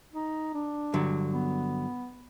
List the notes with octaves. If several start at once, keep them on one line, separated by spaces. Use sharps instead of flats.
D#4
D4
G2 D3 F#3
B3